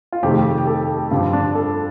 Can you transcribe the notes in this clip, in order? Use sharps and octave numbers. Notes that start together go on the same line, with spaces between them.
F4
F2 C3 D#3 A3 G4
G4
A4
G2 D3 F3 F4
D4
A4